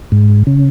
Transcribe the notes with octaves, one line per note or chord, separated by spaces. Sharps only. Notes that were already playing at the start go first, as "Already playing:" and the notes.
G#2
C#3